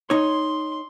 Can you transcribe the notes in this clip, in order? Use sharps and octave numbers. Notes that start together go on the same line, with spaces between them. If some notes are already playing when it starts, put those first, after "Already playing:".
D#4 C#5 C6